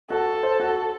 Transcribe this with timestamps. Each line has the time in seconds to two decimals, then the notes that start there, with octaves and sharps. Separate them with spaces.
0.10 F#4 A4
0.43 C5
0.60 F#4